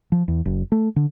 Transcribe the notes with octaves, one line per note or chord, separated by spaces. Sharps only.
F3
E2
F#1
A3
D3